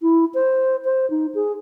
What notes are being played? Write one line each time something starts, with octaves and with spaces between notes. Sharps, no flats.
E4
C5
C5
D#4
G#4